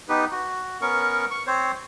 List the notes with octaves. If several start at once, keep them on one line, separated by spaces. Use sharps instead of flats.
B3 D#4 G4 B4
F#4
B3 C#4 A#4 C#6
C#6
C4 C5 C#5